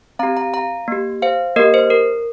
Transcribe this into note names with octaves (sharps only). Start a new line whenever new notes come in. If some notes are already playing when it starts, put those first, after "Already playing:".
C4 G4 F5 A#5
F5 A#5
F5 A#5
A#3 G4
C5 F5
A#3 G4 A#4 D#5
C5
A#4